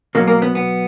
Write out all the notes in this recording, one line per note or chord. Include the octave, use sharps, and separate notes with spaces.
B2 F#3 A#3
A#3
B3
B3